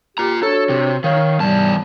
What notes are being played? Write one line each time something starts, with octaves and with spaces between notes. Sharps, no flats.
F4 G4 A#5
D4 F#4 A4 C#5
C3
D#3 C#5 F5
E2 G#2 C3 G3 A5